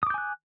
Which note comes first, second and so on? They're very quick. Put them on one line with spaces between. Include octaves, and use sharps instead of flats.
D#6 D6 G6 G#5 F#6